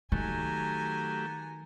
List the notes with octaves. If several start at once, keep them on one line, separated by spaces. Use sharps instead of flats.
D#3 F#3 A3 G4 G#5 A#5